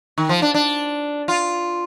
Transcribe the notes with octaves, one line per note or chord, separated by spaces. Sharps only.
D#3
F3
D4
D4
F4